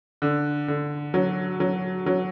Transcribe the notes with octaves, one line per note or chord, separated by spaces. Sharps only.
D3
D3
F#3
F#3
F#3